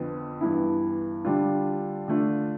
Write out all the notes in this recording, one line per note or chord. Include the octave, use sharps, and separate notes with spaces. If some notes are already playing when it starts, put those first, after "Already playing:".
Already playing: F2 D3 F3 B3
G2 E3 B3 E4
D3 G3 D4 F4
D3 A3 D4 F4